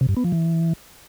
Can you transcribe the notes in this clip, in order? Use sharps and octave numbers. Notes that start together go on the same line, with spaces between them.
C3
G2
B3
F3
E3